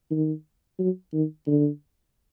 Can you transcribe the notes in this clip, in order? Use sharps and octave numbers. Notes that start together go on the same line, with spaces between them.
D#3
F#3
D#3
D3